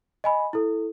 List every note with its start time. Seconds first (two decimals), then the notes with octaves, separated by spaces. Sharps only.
0.24 D#5 G#5 B5
0.53 E4 A4